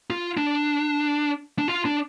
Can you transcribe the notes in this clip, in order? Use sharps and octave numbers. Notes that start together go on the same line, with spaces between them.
F4
D4
D4
F4
D4